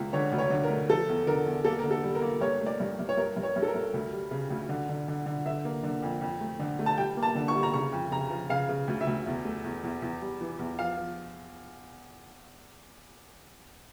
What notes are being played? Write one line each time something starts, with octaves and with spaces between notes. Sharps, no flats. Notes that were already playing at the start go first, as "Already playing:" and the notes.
Already playing: C#2
D3 C#5
D2
C#5
D3
A#4
A3
F3 A4
E2
D3 A#4
E2
A#3 A4
D3 A#4
A4
G3
A#4
A#3
G2 C#5
A3
D5
G2
G2
C#5
G2 A#4
G2
C#5
G2
A4
A#4
G2
D2
G3
C#3
D2
D3
D3
D3
D3
D3 E5
A#3
D3
F2
F2
A3
D3
A3
A5
G3 G5
A#3
A5
D3
C#6
G3
A#5
C#3 C#6
F2
C#3 A#5
F3
C#3 F5
C#3
D2
E5
D2
E2
A3
E2
E2
E2
G3
E3
E2
F3 F5
F3